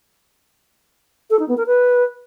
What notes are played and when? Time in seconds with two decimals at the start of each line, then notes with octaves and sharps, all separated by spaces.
1.30 A4
1.39 D#4
1.48 B3
1.57 A#4
1.66 B4